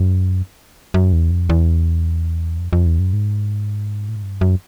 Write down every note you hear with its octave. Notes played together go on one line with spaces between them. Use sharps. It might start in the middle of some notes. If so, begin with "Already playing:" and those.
Already playing: F#2
F#2
E2
F2
E2
F2
F2
E2
F#2
G#2
A2
G#2
G2
F#2